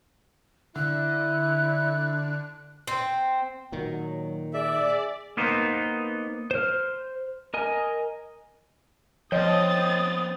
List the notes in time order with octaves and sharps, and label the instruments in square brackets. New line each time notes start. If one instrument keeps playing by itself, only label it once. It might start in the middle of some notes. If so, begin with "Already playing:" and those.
[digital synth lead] D3 [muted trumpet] E4 [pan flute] F#6
[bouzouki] C4
[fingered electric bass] A#2 D#3 [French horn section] F#3
[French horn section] G#4 [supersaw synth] D5 [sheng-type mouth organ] E5
[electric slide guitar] A#3 B3 D#4 C5
[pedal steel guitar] C5 F6
A#4 D#5 G#5
[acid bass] F3 [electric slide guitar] B3 C4 G5 [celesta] C#5 D#5 [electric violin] D#6 A6